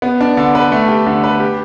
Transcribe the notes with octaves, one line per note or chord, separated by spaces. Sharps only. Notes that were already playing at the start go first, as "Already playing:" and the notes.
B3
D4
D3
B4
A3
G4
D3
B4
G4